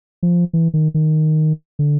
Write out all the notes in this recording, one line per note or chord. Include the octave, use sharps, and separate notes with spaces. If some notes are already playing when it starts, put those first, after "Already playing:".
F3
E3
D#3
D#3
D3